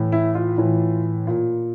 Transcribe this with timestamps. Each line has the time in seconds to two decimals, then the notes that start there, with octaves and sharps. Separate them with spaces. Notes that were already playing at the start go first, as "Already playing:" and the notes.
Already playing: A2 E3
0.12 E4
0.35 F4
0.58 A2 E3
1.27 A#2